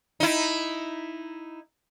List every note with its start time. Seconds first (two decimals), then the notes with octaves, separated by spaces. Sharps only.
0.20 D#4 E4